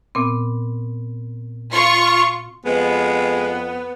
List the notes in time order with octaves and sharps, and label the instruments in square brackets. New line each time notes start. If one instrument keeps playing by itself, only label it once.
[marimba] A#2 B3 C4
[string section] F4 C#6
[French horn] F2 [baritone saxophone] G#3 [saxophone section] B3